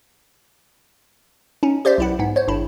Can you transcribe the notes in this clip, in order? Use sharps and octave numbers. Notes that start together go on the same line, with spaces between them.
C#4 D#4
G4 C5 D5 E5
B1 E4 F#5
G#2 B3
C5 C#5
G#1 G2 E4